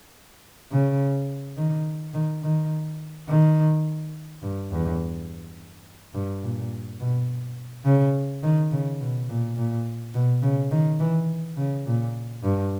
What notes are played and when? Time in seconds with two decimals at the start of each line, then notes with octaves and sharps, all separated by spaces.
0.72 C#3
1.57 D#3
2.14 D#3
2.43 D#3
3.28 D#3
4.43 G2
4.71 E2
6.14 G2
6.43 A#2
7.00 B2
7.85 C#3
8.43 D#3
8.72 C#3
9.00 B2
9.29 A#2
9.57 A#2
10.14 B2
10.42 C#3
10.71 D#3
11.00 E3
11.57 C#3
11.86 A#2
12.43 G2